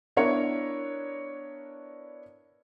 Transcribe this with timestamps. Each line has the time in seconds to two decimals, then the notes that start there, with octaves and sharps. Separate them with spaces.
0.17 B3 D4 E4 A#4 C#5